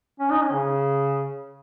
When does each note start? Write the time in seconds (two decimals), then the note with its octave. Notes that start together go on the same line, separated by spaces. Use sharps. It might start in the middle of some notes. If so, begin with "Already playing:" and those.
0.20 C#4
0.31 D#4
0.42 C#4
0.53 C#3